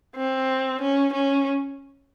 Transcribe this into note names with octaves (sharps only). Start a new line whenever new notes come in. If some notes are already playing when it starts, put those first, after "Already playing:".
C4
C#4
C#4